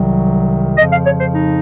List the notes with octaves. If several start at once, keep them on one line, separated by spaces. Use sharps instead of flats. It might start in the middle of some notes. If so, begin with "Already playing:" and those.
Already playing: C2 C3 D#3 F#3
F2 C#3 F3 D#5
F5
C#5
C5
D#4